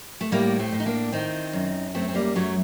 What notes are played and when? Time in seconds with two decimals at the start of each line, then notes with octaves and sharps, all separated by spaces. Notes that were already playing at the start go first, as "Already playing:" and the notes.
0.21 A3
0.32 A2 G3 A#3
0.59 A3 C4
0.72 A2
0.80 D#4
0.86 A#3 D4
1.12 D#3 C4 D#4
1.53 F#2
1.95 F#2 A3 C4
2.09 C4
2.15 G3 A#3
2.35 F#2 F#3 A3